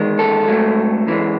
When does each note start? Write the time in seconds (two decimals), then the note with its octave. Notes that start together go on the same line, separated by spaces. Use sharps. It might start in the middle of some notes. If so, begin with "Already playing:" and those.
Already playing: E2 D#3 G#3
0.19 A4
0.48 G#2 F#3 A3
1.06 F#2 E3 G#3